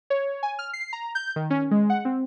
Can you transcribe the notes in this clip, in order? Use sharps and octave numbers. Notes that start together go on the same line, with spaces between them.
C#5
G#5
F6
C7
A#5
G6
D#3
C#4
G#3
F#5
C4